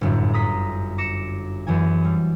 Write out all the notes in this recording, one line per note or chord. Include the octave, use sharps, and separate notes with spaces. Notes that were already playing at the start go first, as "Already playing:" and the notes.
G1 F#2 A2
A#5 D#6 B6 C7
D6 A#6 C#7 E7
F#2 E3 G#5
G3